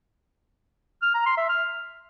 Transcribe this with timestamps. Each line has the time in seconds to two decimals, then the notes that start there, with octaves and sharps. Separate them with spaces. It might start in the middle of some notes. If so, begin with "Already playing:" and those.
1.02 F6
1.14 A#5
1.26 C6
1.37 E5
1.49 F6